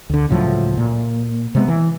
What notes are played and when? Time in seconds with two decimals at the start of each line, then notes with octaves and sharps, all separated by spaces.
0.10 D2 D3
0.29 C#2 A2 F3 F#3
0.77 A#2
1.55 C3 G#3 B3
1.68 E3